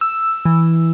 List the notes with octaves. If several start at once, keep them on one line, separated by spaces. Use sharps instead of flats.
E6
E3